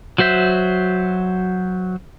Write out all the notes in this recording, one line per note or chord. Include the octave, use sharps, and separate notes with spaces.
F#3 F#4 C5 E5 G6